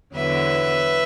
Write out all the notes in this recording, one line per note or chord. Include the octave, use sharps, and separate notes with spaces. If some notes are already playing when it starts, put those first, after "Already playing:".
E2 D3 F#3 B4 E5